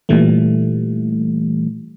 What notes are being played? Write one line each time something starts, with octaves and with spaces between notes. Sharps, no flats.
A#2 E3 G3 A3